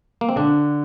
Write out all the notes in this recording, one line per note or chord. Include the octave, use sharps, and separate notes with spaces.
A#3
C4
D3 D4